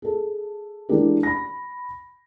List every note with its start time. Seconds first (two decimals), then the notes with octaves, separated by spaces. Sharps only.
0.02 G#4 A4
0.89 E3 G#3 D4 G4 A#4
1.23 B5 A#6